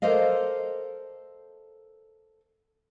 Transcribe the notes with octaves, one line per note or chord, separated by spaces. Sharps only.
A4 A#4 C5 D5 D#5 F5